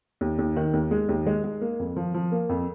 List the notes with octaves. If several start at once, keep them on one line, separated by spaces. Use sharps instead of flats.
D#2
D#2
D#3
D#2
G#3
D#2
G#3
G#3
A#3
F2
F3
F3
A#3
F2